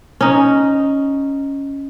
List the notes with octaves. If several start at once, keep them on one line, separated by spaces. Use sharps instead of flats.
C#4 D#4